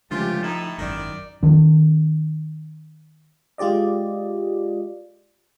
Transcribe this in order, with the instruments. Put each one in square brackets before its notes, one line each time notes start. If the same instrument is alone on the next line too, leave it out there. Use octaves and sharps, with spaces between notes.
[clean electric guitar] C#2 D3 A3 [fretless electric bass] F3 [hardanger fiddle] C#4 G4 [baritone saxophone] F4
[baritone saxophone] A2 [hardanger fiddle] D#4 [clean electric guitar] E4
[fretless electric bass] G#1 F#2 [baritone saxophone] D#3 [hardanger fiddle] D5
[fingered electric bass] D#3 C#4
[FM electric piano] G#3 F4 G4 D5 D#5